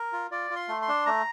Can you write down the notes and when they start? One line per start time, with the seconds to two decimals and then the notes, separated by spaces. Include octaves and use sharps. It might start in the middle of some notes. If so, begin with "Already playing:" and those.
Already playing: A#4
0.13 F4
0.31 F4 D5
0.51 F4
0.56 C6
0.68 A3
0.82 C6
0.88 D4
1.06 A3 A#5